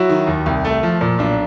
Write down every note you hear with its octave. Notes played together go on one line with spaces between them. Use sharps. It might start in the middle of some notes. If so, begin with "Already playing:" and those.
Already playing: F#3 E4 F#4
D#3
D#2
C2
A3
F3
A#2
B1 D4